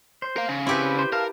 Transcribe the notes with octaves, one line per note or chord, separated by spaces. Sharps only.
C5
A#4 F5
C#3
C4 E4 G4 B4
C5
A#4 F5 A5 F6